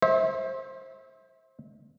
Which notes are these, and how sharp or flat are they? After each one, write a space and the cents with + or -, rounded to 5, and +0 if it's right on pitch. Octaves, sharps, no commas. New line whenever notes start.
C5 +25 E5 -30